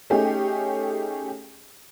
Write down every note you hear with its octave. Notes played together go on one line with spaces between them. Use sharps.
A3 C#4 D#4 G4 G#4